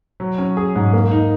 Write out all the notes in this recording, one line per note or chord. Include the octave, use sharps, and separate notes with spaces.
F#3
C#4
G#4
G#2
A#3
D#4